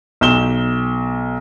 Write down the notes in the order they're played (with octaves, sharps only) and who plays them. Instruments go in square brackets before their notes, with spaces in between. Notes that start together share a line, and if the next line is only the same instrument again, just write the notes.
[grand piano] B1 E7 G7